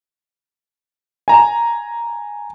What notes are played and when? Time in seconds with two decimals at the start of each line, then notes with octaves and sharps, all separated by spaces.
1.28 G#5 A#5